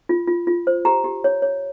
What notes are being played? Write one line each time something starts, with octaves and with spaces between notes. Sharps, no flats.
F4
F4
F4
C5
G4 A#5
G4
C#5
C#5